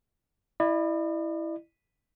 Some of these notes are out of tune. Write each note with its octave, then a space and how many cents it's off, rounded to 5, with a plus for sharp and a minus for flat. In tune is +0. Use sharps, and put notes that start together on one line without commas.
E4 +0 D5 +45